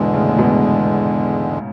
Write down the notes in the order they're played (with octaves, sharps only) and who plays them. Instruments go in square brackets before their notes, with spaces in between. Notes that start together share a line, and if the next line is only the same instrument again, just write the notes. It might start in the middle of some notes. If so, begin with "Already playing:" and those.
Already playing: [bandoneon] E2 D3 G#3 [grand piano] G#2 B2
[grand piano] A2 C#3
A2
G#2 B2